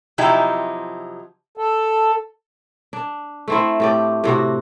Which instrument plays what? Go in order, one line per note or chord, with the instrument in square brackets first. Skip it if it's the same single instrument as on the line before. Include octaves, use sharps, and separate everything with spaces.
[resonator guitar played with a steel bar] C3 F3 F#3 D#4 E4 G4
[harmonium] A4
[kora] D4
A3 C4 E4
A2 G4 D5
A2 C3 F#4